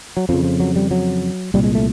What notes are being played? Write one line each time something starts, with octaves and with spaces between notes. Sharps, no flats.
F#3
F2 C#3 F3
F3
F#3
G3
F#3
C2 A#2 G3
G#3
A3